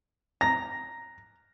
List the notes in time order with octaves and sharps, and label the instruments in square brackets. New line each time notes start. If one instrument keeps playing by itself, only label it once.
[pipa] A#5 [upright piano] A#6